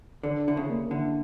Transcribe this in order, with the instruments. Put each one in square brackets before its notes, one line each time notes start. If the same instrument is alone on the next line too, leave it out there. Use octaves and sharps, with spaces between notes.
[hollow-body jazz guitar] D3 [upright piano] A4
[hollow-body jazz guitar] D3 [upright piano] E4
[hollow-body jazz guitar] C#3
[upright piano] A#3
[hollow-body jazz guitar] D3 [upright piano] E4